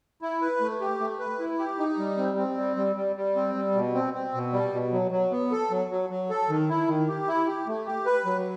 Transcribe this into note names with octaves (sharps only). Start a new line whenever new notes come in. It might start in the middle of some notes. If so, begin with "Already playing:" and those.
E4
B4
A3
G4
A3
B4
E4
G4
D#4
G3
C4
C4
G3
G3
G3
G3
C4
G3
B2
C4
C4
B2
G3
B2
F#3
F#3
B3
A4
F#3
F#3
F#3
A4
D#3
E4
D#3
G4
E4
G4
A3
G4
B4
F#3